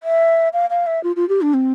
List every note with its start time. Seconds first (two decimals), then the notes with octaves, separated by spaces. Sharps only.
0.03 E5
0.53 F5
0.70 F5
0.87 E5
1.04 F4
1.16 F4
1.29 G4
1.42 D4
1.54 C4